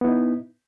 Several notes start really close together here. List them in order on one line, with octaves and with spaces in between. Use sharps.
B3 E4 D#4